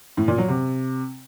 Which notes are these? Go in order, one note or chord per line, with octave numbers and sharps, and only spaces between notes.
A2
A#2
F#3
C3